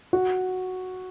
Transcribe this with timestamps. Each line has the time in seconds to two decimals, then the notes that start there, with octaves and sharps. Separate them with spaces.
0.13 F#4